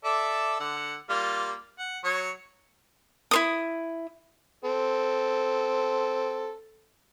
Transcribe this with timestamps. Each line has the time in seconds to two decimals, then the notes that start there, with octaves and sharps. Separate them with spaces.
0.04 A4 D5 E5
0.60 D3 F#5
1.09 G3 A#3 F4
1.79 F#5
2.04 F#3 C#5 C#6
3.31 E4 C5 D#6
4.65 C4 A4